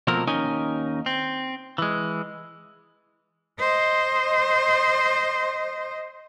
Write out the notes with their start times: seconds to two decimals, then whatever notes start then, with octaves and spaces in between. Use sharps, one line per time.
0.07 B2 F3 A3 A#3 C4 A#4
0.27 D#2 C#4 D#4 A#4 D#5 G#5
1.06 C4
1.78 E3 G#3
3.59 C5 D#5